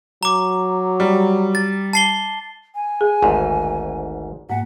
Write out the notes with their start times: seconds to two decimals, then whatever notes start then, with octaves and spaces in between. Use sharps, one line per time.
0.23 F#3 A#5 D6
1.00 G3
1.55 A6
1.93 A5 C7 G7
2.75 G#5
3.01 G#4
3.22 G#1 D2 G#2
4.50 G#2 A#3 F#5